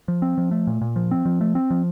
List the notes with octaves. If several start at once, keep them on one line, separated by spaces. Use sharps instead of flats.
F3
C4
F3
A3
A#2
A#2
F3
C4
F3
A3
C4
F3